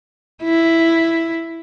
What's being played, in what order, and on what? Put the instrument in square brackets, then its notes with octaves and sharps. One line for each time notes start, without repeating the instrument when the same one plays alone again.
[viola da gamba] E4